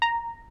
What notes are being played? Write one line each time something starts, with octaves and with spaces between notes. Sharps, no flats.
A#5